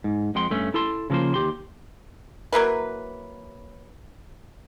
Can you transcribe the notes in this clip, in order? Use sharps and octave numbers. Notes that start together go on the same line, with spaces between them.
G#2
F2 G#3 F#5 G5 C6
G2 A3 C#4
E4 A4 A5 C6
C#3 F3 G#3 A#3 C5
D#2 G4 C6
F#3 A#3 E4 B4